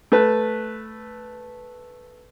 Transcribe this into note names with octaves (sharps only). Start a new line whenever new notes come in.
A3 B4